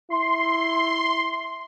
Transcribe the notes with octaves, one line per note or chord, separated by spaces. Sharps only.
E4 C6